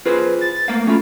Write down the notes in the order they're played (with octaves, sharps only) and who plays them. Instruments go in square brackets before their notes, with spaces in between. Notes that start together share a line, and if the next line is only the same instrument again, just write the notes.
[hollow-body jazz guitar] F4 G#4 C5 [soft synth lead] B4
[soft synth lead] A6
[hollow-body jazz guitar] A3 A#3 F5
[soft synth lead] A3 [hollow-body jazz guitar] C#4 F4